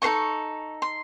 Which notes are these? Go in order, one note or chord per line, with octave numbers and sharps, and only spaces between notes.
D#4 A4 C5 D#5 C#6
C6